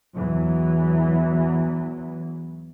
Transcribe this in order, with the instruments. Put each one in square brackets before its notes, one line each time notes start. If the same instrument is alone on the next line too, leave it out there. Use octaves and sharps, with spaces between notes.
[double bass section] E2 E3 F#3